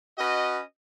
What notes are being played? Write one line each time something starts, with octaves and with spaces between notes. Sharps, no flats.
C#4 F#4 B4 D#5